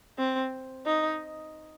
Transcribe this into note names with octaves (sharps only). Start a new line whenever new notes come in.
C4
D#4